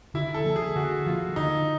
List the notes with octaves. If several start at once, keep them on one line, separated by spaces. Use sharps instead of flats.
D3 E4
A4
F3 A#3
G#4
D3 F#4
F3 A#3 F4
D3 D#4